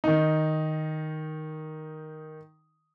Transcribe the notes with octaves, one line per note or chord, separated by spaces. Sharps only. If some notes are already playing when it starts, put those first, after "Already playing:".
D#3 D#4